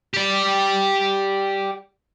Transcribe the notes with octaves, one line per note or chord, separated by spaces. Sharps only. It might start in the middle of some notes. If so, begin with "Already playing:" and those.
G4 D5